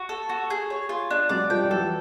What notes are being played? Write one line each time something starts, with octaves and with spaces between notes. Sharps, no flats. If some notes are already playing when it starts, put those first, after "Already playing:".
Already playing: F#4
A4
F#4
G#4
C#5
F4
D4
F#3 G#3 D5
F3 G3 G5
G3
E3 F#3 A4